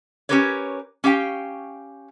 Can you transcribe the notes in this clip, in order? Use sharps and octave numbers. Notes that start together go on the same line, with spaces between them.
C#4 E4 G4 A#4 B4 C#5
C#4 G4 F5 G5